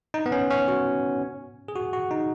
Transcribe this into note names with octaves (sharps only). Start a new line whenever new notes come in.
D#4
B3
C#4
C#4
F#4
G#4
F#4
F#4
D#4